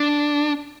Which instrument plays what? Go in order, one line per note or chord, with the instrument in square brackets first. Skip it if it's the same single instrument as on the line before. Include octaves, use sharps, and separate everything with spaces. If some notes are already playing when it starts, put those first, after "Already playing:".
Already playing: [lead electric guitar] D4